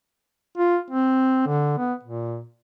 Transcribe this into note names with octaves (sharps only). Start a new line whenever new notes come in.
F4
C4
D3
B3
A#2